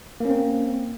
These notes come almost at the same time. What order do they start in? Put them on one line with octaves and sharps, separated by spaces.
A#3 C#4 C4